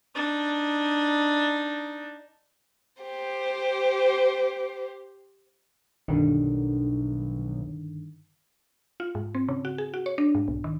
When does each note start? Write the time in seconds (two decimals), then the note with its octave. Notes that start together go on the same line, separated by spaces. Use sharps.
0.15 D4 D#4
3.02 G4 C5
6.08 B1 G2 D3 D#3
9.00 F4
9.15 G#2
9.35 C4
9.49 C#3
9.65 F#4
9.78 G#4
9.94 F#4
10.06 C#5
10.18 D4
10.35 G#2
10.48 B1
10.64 D#3